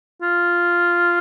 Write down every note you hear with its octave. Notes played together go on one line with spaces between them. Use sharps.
F4